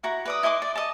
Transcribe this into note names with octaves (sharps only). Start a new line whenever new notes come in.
E4 F#4 A#5
B4 D5 D#6
E4 D#5 C6 D6
D5
D#5 A5